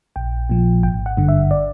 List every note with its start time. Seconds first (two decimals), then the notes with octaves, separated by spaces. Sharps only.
0.16 A#1 G5
0.50 A#2 F3
0.83 G#1 G5
1.06 F#5
1.17 G2 D3
1.29 E5
1.51 D5